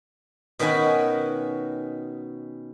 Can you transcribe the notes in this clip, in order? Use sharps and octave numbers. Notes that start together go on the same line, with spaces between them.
B2 D#3 C#4 F#4 B4 G#5